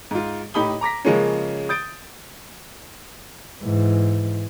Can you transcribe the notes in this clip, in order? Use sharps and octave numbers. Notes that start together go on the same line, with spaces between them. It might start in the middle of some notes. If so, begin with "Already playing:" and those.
G#2 F4
A2 D#4 G4 B5 D#6 G7
A#5 D6 A#6 B6
C#3 F3 G#3 A#3 C#4
D#6 G6 A6 D7
G#2 E3